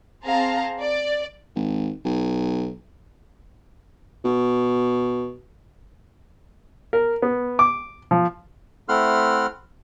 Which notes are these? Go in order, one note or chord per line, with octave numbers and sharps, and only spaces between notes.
C4 G#4 C5 F5 A5 A#5
D5
G#1
B1
B2
A#4
B3
D6
F3
A3 C4 E4 F#5 C6 F6